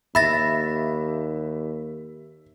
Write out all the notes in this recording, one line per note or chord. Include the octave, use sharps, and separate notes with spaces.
D#2 E5 B5 A6 A#6